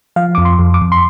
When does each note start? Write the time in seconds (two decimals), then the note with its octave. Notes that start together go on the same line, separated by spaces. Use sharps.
0.16 F3 F5
0.35 F2 D6
0.45 C6
0.59 F2
0.74 D6
0.81 F2
0.92 C6